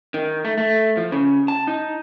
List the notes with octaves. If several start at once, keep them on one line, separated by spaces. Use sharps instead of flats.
D#3
A3
A3
F3
C#3
A5
D#4